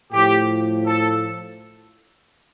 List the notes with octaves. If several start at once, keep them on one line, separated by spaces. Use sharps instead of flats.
A2 F3 G4
A4